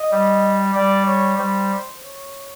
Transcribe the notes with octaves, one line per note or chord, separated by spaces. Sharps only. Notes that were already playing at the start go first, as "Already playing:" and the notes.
Already playing: D#5
G3
G3 D5
C#5
G3 C5
C#5